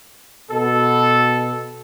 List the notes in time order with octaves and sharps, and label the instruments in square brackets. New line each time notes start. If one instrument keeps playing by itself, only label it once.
[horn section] B2 A4